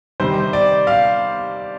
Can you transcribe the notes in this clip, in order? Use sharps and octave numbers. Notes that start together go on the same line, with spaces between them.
C3 D#3 G3 C5
D5
F5